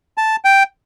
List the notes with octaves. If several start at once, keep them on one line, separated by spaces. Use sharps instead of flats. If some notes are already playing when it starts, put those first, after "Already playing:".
A5
G5